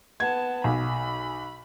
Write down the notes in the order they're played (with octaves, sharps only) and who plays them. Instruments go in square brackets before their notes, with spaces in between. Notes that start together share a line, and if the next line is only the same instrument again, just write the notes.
[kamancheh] B3 A5 [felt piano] G#6
[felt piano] B1 [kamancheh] B5